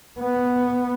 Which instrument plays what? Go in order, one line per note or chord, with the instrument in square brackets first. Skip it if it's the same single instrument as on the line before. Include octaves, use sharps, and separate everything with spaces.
[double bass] B3